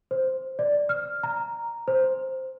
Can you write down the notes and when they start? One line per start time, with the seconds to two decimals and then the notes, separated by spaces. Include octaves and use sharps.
0.11 C5
0.59 D5
0.89 F6
1.23 A#5
1.88 C5